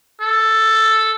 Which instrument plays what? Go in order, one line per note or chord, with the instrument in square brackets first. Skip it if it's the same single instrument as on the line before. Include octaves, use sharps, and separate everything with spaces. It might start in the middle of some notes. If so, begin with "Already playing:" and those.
[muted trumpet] A4